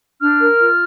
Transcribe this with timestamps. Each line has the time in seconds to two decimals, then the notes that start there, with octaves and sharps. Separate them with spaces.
0.20 D4 F6
0.39 A#4
0.59 F4